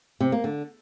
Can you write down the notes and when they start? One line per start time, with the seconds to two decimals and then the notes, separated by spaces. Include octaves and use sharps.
0.20 C3
0.32 A#3
0.44 D3